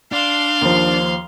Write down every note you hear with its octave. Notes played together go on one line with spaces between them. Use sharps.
D4 F5 C6
D#2 F3